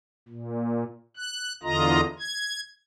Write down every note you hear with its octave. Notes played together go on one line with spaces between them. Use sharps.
A#2
F#6
E2 D3 F4 D#5 A#5
G#6